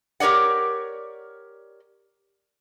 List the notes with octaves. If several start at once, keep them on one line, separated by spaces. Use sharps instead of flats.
G4 A#4 C#5 D5 F#5